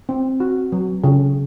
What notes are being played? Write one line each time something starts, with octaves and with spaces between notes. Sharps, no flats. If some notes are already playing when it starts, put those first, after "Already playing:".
C4
F#4
F#3
C#3